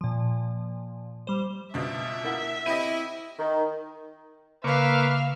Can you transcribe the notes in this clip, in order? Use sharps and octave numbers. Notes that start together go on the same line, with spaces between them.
A#2 F3
G3 C5
C#2 B2 D4 E5
A#3 E4 F#5
C4 E4 G4 D#5 D#7
D#3
C#3 A#3 B4 E5 F5 C#6 D6